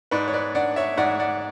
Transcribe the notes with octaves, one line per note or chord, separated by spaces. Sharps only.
G#2 B4 D5
C#5
B4 D5
D4 D5 F#5
C#5 E5
G#2 D5 F#5
D5 F#5